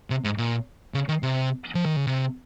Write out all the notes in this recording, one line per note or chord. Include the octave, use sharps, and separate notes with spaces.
C3
G#2
A#2
C#3
D#3
C3
F3
D#3
C#3
C3